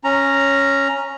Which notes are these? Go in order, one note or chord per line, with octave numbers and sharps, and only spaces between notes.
C#4 A#5